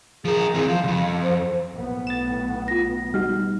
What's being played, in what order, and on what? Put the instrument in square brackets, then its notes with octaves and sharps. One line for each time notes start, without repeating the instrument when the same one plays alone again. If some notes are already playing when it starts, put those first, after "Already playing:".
[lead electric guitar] F3 A#4 [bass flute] G#4
[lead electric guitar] E3 C4
[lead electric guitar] F3 [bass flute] F5
[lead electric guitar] C2 F2
[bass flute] C5
[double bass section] B1 A2 B3
[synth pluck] A6 E7
[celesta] F4 A#6
[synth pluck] G3 D#4 F#4 [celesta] F6